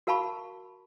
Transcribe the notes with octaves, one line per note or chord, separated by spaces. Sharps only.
F#4 A#4 F5 A5 B5 C#6